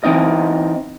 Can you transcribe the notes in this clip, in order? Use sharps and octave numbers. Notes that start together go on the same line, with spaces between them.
E3 C4 D#4 D#5